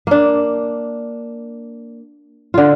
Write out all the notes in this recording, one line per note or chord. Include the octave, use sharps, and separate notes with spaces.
A#3 D4
D3 F4